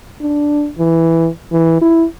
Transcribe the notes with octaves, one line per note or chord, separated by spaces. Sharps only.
D4
E3
E3
E4